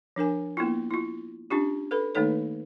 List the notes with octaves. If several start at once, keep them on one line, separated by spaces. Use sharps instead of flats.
F3 D4 A#4 G#5
A#3 B3 E4 F4
E4 F4
C#4 D4 F4 G4
A4 B4 B5
D#3 A3 A#3 D#4 A4 C#5